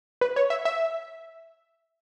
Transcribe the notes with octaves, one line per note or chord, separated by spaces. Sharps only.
B4
C#5
E5
E5